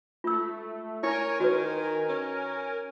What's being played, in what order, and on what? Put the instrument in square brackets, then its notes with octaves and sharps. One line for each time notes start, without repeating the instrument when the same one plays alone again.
[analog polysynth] A3 [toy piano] F4 E6
[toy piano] E4 [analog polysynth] A#4 G#5 [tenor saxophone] C#5
[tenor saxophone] D#3 [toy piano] F#4 B4
[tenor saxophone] C#4